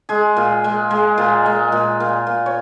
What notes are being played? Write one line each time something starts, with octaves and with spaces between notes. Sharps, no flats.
G#3 G#4
A#2
G#3
G#3
A#2
G#3
A#2
A#2
A#2
C#5